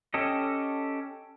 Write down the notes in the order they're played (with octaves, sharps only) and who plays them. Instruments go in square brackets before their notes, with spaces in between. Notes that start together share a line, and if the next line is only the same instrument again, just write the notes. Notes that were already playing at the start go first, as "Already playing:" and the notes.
[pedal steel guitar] C#4 G4 A4 D#5